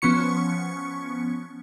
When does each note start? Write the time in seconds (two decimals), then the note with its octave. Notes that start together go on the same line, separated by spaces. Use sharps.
0.02 F3 B3 C#4 C#6 C#7